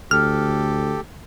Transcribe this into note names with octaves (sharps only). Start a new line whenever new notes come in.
D2 G4 A4 F6